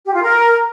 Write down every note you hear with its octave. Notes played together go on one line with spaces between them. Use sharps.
G4
F4
A#4